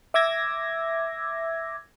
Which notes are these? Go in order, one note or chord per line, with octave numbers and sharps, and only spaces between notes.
E5 D6 E6 G#6 A#6